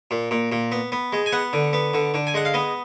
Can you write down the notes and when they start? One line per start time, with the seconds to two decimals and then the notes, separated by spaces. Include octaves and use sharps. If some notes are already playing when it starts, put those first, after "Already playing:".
0.11 A#2
0.31 A#2
0.52 A#2
0.72 B3
0.92 B3
1.12 G#3
1.26 G#5
1.32 B3 F#5
1.53 D3
1.73 B3
1.94 D3
2.14 D3
2.27 G#5
2.34 G#3 F#5
2.45 F5
2.54 B3 D#5